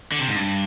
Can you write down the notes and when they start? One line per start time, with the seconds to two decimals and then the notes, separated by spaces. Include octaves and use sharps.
0.12 D3
0.19 C3
0.28 G#2
0.36 G2